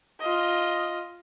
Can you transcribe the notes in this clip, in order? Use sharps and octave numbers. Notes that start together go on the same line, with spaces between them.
F4 D#5